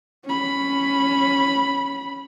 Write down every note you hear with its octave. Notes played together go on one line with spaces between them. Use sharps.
C#4 B5